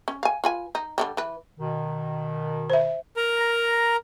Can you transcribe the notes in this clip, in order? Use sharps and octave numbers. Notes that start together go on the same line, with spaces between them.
C#4
F5 G#5
F4 B4 G#5
D#4
D3 D#3 G3
E3 B4
B2 D#3
C5 E5
A#4 A#5